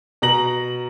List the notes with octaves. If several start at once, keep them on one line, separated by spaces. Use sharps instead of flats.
B2 A#5 A#6 F#7